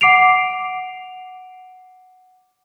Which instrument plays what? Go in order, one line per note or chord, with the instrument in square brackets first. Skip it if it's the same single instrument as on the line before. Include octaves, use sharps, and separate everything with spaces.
[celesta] F#5 D6 C7 D7 F7